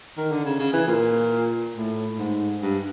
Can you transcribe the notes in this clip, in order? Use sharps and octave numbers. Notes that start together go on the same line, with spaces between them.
D#3
D3
C#3
C#3
E3
A#2
A2
G#2
G2